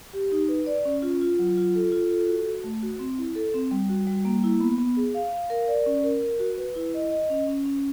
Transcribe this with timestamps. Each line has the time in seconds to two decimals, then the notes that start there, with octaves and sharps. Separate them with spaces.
0.13 G4
0.32 D#4
0.49 B4
0.66 D5
0.85 C#4
1.02 F4
1.21 F4
1.39 F#3
1.57 F4
1.75 A4
1.92 F4
2.10 A4
2.28 F#4
2.46 F#4
2.64 A3
2.82 F#4
2.99 C4
3.18 E4
3.35 A4
3.54 C4
3.71 G3
3.89 F#4
4.07 G3
4.25 A#3
4.44 E4
4.60 B3
4.78 B3
4.97 G#4
5.14 F5
5.32 F5
5.50 A#4
5.68 D5
5.86 C#4
6.04 A#4
6.22 A#4
6.40 F#4
6.58 B4
6.75 E4
6.94 D#5
7.11 D#5
7.30 C#4
7.48 C#4
7.66 C#4